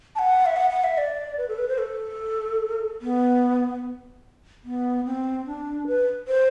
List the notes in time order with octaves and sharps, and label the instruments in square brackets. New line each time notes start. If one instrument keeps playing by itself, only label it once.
[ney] A5
F#5
E5
F#5
F#5
E5
D5
B4
A4
B4
C5
A4
B3
B3
C4
D4
B4
C5